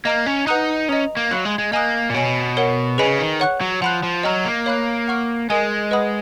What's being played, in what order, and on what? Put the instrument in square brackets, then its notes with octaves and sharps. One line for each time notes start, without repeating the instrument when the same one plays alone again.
[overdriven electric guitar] A#3 [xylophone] D#5 A#5 F6
[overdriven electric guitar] C#4
[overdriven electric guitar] D#4 [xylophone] B4 F#5 A#5 D#6 F#6
[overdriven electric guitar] C#4 [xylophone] D#5 A#5 D#6
[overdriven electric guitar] A#3
[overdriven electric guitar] F#3 [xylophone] F5 B5 F#6
[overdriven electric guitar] G#3
G#3
[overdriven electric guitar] A#3 [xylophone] D#5 G#5 D#6 F#6
[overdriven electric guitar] A#2
[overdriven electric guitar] B2 [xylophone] C#5 G#5 B5
[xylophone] A#4 C#5 F#5
[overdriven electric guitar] C#3 [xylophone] G#4 B4 D#5 G#5 B5
[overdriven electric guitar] D#3
[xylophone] C#5 F#5 C#6 F#6
[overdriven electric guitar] F#3
[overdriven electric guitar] F3 [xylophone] F#5 B5 F#6
[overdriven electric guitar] F3
[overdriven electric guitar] F#3 [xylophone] D#5 A#5 F6
[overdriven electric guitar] A#3
[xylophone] C#5 F5 B5 F#6
F#5 C#6 F6
[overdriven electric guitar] G#3 [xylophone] A#4 D#5 G#5 D#6
[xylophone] B4 D#5 F#5 B5 D#6